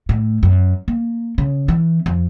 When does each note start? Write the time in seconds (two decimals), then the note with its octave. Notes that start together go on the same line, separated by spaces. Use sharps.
0.09 A2
0.43 F#2
0.88 A#3
1.38 C#3
1.68 E3
2.06 F2